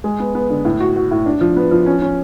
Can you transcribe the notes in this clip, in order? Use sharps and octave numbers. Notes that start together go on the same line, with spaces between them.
G#3
B3
B3
D3
A2
F#4
F#4
A2
D4
F3
B3
F3
C#4
C#4